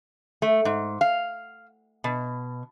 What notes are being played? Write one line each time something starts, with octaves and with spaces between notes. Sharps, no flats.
A3
G#2
F5
B2